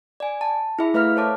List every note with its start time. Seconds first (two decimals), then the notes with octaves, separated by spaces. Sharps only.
0.20 D5 G#5
0.41 A5
0.79 E4 G#4 E5 B5
0.94 A3 B4 E5 F5 B5 F6
1.16 A4 C5 C#5 A5 D6